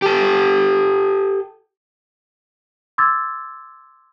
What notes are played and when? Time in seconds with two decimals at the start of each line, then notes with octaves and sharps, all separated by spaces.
0.02 G4 A4
2.98 C6 D6 E6 G#6 A6